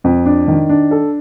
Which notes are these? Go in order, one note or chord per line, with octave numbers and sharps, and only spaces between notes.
F2
D4
D#3
D4
A4